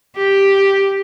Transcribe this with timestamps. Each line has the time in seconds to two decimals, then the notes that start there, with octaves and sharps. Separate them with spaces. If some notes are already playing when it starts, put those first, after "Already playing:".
0.17 G4